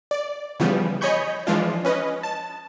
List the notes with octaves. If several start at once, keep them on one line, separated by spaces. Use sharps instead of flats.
D5
C#3 E3 F3 G3 B3
C#5 D#5 G#5 B5 C#6 G6
E3 F3 G#3 D4 F4
C#4 B4 D#5
A5